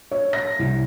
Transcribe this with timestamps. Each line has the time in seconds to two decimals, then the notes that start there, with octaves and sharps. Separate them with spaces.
0.11 C#5
0.33 A#6
0.59 C2